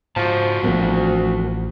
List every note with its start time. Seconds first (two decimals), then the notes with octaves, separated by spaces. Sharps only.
0.16 G#2 F3 F#4 C5 A5
0.63 A1 D2 A2 F3 A#3 C4